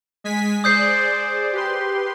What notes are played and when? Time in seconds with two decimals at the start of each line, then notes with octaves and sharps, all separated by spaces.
0.24 G#3 G#5 B6
0.64 G#4 C5 D5 D#6 G6 C7
1.53 G4 B4 C6